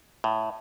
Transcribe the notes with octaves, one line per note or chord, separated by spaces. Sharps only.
A2